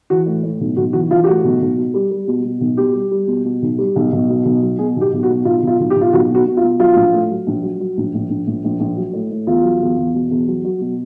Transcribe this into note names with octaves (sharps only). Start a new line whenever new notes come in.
E3 F#4
A2
A2
B1
B1 F#4
E3 F#4
E3 F4
G4
A2 F#4
B1
B1
B2
G3
G3
B2
B2
B1
B2 G4
G3
G3
B2
B2
B1
G3
B1
B1
B2
B1
F#3
B2 G#4
B1
G4
B1
F#4
B2
B1 F4
B1 F4
B1
G4
B1
F4
B1 F#4
B2 F#4
B2
F4
B2
F#3 F4
A#1
A2
F#3
A#1
F#3
F#3
A#1
A#1
A#1
A#1
A#1
A#1
F#3
A2
A2
E2 F4
F#3
E2
E2
B2
E2
F#3
F#3
B2